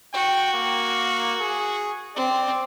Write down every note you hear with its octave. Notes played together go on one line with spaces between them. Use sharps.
F#4 G5
A#3
G#4
C4 D5